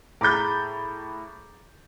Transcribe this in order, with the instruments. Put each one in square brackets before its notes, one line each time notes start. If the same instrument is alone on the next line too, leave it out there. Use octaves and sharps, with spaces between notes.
[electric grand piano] A2 B5 A6 [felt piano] G#4 A#5 [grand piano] D6 G6